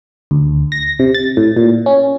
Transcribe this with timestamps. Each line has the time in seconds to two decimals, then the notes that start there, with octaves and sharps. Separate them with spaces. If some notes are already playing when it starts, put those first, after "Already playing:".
0.31 D2
0.72 A#6
0.99 C3
1.15 A6
1.37 A2
1.56 A#2
1.86 C#4